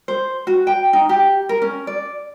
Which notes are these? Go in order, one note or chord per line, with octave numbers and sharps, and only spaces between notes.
C5
F#4
G5
D#4
G4
A#4
C#4
D5